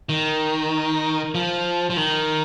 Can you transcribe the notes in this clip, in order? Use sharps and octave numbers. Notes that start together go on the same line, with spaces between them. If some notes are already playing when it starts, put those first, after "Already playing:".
D#3
F3
F3
D#3